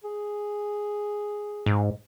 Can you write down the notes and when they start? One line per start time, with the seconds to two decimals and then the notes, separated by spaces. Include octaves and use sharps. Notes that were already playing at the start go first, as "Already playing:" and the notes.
0.04 G#4
1.66 G#2